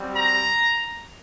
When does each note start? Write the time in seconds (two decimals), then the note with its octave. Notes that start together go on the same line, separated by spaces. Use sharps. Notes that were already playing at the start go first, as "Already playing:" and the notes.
Already playing: G3 C4 F#4
0.15 A#5